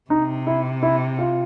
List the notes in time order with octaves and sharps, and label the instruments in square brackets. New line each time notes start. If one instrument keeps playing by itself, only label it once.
[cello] C3 [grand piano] D#4
[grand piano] E4
E4
F4